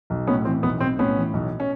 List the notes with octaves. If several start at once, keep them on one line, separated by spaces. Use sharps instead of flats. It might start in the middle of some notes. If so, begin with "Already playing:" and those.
B1
A2 B3 C#4
E3 C4
B1 B3
B1 C4
A2 B3 C#4
E3
B1
C#4